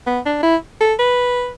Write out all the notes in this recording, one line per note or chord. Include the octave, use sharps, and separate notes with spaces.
B3
D4
E4
A4
B4